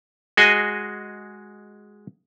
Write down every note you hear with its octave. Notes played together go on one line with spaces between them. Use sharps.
G#3 F#4 G#4 D#5 G#5